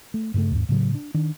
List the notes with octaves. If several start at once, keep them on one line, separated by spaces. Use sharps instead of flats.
A3
G2 C#3 G3 A3
D#2 G#2
A2 C#3 F#3
D4
D#3 D4